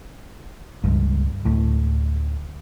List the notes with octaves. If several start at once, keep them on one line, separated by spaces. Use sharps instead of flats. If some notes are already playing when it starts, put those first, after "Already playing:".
C#2 G2
D2 A2